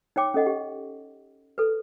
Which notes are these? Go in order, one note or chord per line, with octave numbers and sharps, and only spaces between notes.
D#4 C#5 G5 D6
C#4 A4 D#5 F#5
G4
A4 B4